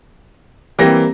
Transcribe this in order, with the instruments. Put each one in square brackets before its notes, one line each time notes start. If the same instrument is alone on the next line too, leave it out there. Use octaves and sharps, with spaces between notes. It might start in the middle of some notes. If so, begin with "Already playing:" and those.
[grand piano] E3 G5 A#6 [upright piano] G3 A#3 C4